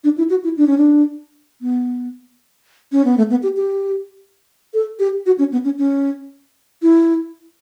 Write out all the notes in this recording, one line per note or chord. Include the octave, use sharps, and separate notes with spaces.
D4
E4
F#4
E4
D4
C#4
D4
B3
C#4
B3
A3
B3
G4
G4
A4
G4
F#4
C#4
B3
C#4
C#4
E4